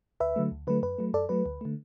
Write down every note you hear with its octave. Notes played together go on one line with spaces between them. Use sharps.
D2 B4 E5
D3 F#3 A3
D2
D3 F#3 A3 B4
F#2 B4
F#3 A3
F#2 A4 D5
F#3 A3 B4
D2
D3 A3